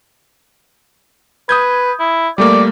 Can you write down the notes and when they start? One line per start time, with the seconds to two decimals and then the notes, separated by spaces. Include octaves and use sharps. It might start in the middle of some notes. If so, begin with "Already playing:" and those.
1.49 B4 D#6 G6 G#6
1.99 E4
2.38 G3 A3 A#3 D5